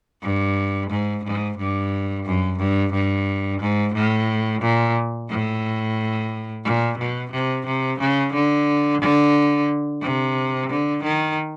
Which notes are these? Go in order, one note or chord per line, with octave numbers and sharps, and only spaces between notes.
G2
G#2
G#2
G2
F#2
G2
G2
G#2
A2
A#2
A2
A#2
B2
C3
C3
C#3
D3
D3
C3
D3
D#3